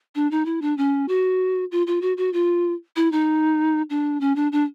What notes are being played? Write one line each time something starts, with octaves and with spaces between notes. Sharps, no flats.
D4
D#4
E4
D4
C#4
F#4
F4
F4
F#4
F#4
F4
E4
D#4
D4
C#4
D4
D4